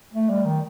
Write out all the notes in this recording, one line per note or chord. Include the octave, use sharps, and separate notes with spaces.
A3
G3
D#3